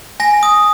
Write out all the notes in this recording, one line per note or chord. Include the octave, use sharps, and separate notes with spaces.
G#5 A#6
D#6